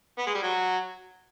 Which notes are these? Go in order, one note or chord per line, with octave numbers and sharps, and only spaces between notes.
B3
G#3
G3
F#3